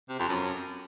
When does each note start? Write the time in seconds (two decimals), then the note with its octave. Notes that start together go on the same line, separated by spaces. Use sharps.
0.09 C3
0.19 F2
0.29 F#2